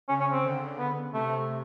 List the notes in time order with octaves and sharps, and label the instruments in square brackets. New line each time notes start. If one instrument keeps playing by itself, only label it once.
[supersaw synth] C#3 [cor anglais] C#4
[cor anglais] C#4
C4
[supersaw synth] D3
[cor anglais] B3
[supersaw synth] C3 [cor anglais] A3